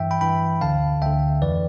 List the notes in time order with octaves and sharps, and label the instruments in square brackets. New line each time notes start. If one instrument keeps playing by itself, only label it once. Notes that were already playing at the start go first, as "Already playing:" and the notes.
Already playing: [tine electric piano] G2 E3 E5 G5
G5 B5
G2 E3 G5 B5
D2 D3 F5 A5
D2 D3 E5 G5
F2 E3 B4 D5